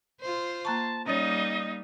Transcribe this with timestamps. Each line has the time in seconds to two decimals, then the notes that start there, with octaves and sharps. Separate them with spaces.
0.21 F4 C5
0.65 A#3 A5 A#5 C#6
1.06 G3 A#3 C#4 D#4 C#5 D#5